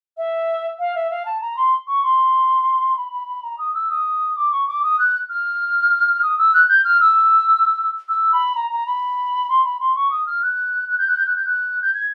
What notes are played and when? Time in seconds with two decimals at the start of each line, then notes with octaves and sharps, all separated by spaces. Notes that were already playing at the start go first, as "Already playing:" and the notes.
0.17 E5
0.79 F5
0.95 E5
1.11 F5
1.25 A5
1.41 A#5
1.57 C6
1.87 C#6
2.03 C6
2.97 B5
3.12 B5
3.28 B5
3.43 A#5
3.58 D#6
3.74 E6
3.90 D#6
4.36 D6
4.52 C#6
4.68 D6
4.83 D#6
4.99 F#6
5.30 F6
6.22 D#6
6.38 E6
6.54 F#6
6.69 G6
6.84 F6
7.00 E6
8.09 E6
8.32 B5
8.55 A#5
8.71 A#5
8.87 B5
9.49 C6
9.64 B5
9.80 C6
9.95 C#6
10.11 D#6
10.27 F6
10.42 F#6
10.88 F#6
10.98 G6
11.08 F#6
11.17 G6
11.26 F#6
11.36 G6
11.45 F#6
11.82 G6
11.94 G#6